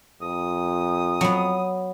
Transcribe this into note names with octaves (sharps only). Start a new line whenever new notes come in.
F2 D#6
F#3 B3